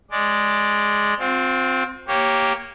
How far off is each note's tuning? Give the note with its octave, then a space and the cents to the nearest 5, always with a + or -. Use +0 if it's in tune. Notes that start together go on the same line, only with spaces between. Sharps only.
G#3 +0 D5 +0
C4 +0 F4 +35
A#3 +0 G4 +0 C#5 -5